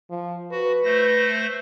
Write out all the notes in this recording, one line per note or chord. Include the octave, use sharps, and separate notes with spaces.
F3
F#4 B4
A3 C5 A#6